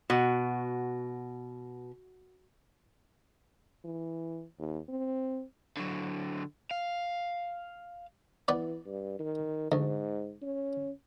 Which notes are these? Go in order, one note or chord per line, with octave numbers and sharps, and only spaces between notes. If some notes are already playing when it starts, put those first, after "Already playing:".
B2 F#4
E3
D#2
C4
D3 F#3
F5
E3 B3 B4 D5
G2
D#3
D2 G#2
C#4